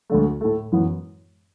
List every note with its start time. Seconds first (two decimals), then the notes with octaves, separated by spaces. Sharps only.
0.10 D2 D3 A3
0.41 A2 A3
0.72 F#2 E3 B3